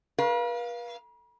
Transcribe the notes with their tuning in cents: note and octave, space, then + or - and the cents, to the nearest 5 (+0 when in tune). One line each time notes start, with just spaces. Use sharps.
B4 -45 F5 +0